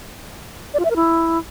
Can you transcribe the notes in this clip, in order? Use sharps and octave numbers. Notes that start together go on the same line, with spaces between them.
D5
F4
E5
A#4
E4